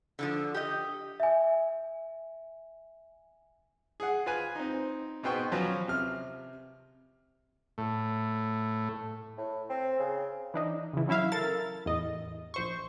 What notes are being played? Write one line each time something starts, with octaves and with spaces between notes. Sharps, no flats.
D3 E3 F3
G4 D#5
E5 G#5
G#4 F#5
F4 B4 G#5
C4 D#4
G#2 B2 B3 G5 C6 C#6
F3 F#3 C#4 F4 F#4 B4
C3 F6
A2
A2
C4
C#3
E3 D4 D#4
C#3 E3
F#3 C#4 E4 E5 F5
A4 A#4 A6
E2 A2 D#5
A#1 C5 C#6